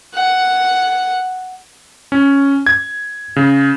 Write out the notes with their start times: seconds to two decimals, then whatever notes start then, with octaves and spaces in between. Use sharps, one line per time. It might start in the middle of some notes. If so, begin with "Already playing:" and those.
0.14 F#5
2.12 C#4
2.66 G#6
3.36 C#3